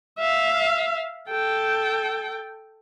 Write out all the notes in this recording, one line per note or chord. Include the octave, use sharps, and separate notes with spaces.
E5 F5
A4 G5